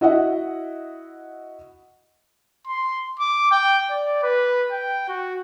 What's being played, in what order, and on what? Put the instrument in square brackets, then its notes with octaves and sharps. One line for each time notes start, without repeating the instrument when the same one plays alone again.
[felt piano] E4 F#4 D#5 E5 F#5
[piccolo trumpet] C6
D6
G5
D5
B4
G5
F#4